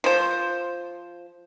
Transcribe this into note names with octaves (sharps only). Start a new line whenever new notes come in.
F3 C5